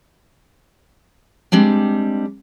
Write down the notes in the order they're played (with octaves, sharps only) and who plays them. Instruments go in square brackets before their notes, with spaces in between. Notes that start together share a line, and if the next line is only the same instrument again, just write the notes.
[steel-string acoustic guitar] G3 G#3 C4 D4